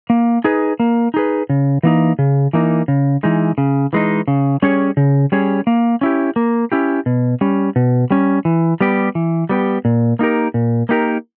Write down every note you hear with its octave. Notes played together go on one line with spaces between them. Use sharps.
A#3
D#4 G#4 B4
A#3
D#4 G#4 B4
C#3
E3 A#3 D#4
C#3
E3 A#3 D#4
C#3
E3 G#3 D#4
C#3
E3 G#3 D#4
C#3
G3 C#4 G#4 C#5
C#3
G3 C#4 G#4 C#5
A#3
C#4 E4 G4
A#3
C#4 E4 G4
B2
G3 C#4
B2
G3 C#4
E3
G3 B3 G4
E3
G3 B3 G4
A#2
A#3 D#4 G4 A#4
A#2
A#3 D#4 G4 A#4